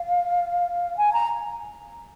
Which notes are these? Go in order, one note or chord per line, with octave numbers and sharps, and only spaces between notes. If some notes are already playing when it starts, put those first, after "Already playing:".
Already playing: F5
G#5
A#5